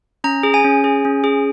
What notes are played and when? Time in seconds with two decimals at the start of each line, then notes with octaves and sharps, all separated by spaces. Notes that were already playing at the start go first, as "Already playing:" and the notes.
0.24 C#4 A#5
0.43 G#4
0.54 G#5
0.64 C#4
0.84 G#4
1.05 C#4
1.24 G#4